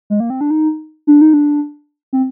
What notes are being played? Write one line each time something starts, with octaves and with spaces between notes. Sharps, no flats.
G#3
A#3
C4
D4
D#4
D4
D#4
D4
C4